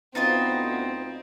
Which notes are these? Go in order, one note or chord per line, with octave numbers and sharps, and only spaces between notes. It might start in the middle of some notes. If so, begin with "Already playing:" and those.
D2 B3 C4 D#4 F4 D#5